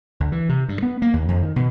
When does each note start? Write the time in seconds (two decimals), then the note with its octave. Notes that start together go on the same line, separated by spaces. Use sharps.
0.20 D2
0.32 E3
0.49 C3
0.69 G2
0.83 B3
1.02 A#3
1.14 D#2
1.28 F2
1.42 D#3
1.56 B2